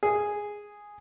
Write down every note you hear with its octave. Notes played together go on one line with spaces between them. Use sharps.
G#4